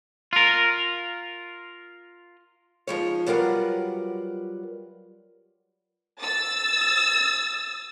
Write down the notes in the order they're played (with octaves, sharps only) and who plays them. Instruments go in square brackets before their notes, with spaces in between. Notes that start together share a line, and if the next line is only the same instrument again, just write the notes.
[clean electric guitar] F4 A#4
[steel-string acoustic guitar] D#3 F3 G#3 C#5
F#3 G3 F4 A#4 B4 F#5
[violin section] E6 A6